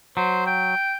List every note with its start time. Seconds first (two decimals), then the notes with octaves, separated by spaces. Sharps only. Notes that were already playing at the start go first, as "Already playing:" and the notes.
0.17 F#3 C5
0.47 G5